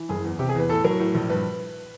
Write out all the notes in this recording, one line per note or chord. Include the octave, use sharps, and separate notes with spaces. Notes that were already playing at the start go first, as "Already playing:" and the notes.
Already playing: E3
F#1 G#4
E2
C3 G4
G#4
E2 B4
A2 A4
F#3 A#4
A2
A#1
G2 B4